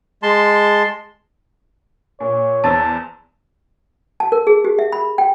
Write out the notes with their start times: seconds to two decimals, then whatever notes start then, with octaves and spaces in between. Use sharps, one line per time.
0.23 G#3 A5 C6
2.20 A#2 C#5
2.64 E2 C5 A5 E6 A6
4.20 A5
4.32 A#4
4.47 G#4
4.65 G4
4.79 E5
4.92 B5
5.18 G5